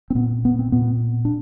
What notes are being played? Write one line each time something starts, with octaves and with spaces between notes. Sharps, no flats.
C4
A#2 B3
B3
C4
A#2 B3
D4